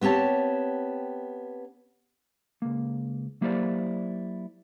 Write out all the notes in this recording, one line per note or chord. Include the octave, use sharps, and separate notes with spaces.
B3 C4 G4 C#5 A5
C#2 A#3
F#3 A#3 E4 G4 C5 D5